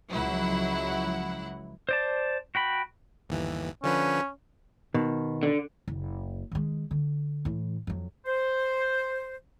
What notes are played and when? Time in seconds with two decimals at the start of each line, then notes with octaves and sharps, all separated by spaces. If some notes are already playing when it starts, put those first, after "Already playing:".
0.13 C#2 F3 F#3 E4 F#5
1.89 C5 D5 A5
2.55 F#4 G5 B5
3.29 G1 D#2 E3
3.83 D3 F3 C#4 B4
4.94 B2 D#3
5.43 D3
5.88 F#1
6.52 D#3 G#3
6.91 D3
7.45 A2 E3
7.87 F2 F#3
8.26 C5